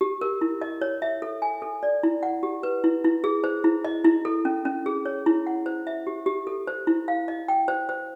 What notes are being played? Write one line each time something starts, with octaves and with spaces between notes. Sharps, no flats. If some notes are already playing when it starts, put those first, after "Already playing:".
G4
A#4
E4
D#5
C#5
E5
A4
G#5
A4
D5
E4
F#5
G4
B4
E4
E4
G#4
C5
E4
D#5
E4
A4
C#4
C#4
G#4
C#5
E4
F#5
C5
E5
G4
G4
A4
C5
E4
F5
D#5
G5
C5
C5